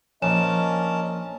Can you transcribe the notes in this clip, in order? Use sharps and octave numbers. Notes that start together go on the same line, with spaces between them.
A#1 C#4 A#4 C#5 D#5 G#5 A5 E7